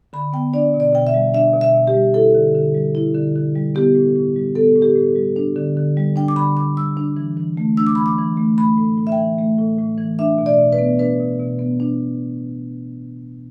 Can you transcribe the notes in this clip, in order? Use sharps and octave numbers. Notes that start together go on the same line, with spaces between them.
D3 B5
B3 G5
D4 D5
B2
D5
B2 G5
E5
G3
D4 E5
B2
E5
B2
G4
G3
E4 A4
D3
D3
G3
E4
D3
D3
G3
B3 G4
A2
A2
G3
B3 A4
A2
G4
A2
G3
D4
D3
D3
G3
D4 G5
D6
D3 B5
D3 D6
G3 E6
D4
E3
E3
A3
D4 E6
D6
E3 B5
D6
E3
A3
A3 B5
A2
A2
E5
G5
E3
A3
A2
A2
E3
D4 E5
B2
D5
B2
B4
B3
D4 B4
B2
B2
B3
D4